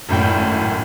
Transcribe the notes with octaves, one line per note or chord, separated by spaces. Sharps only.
G#1 F#2 A2 G5